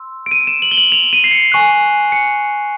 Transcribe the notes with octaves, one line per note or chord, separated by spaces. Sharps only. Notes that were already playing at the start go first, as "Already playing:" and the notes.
Already playing: C6 E6
D7
D#7
E7
F#7
G7
F#7
F7
D#7
C7
C#7
G#5 C#6 F#6
C#7